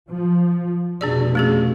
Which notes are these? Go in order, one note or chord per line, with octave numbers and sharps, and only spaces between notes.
F3
F1 B2 D4 G#4 D5
A3 C#4 G#4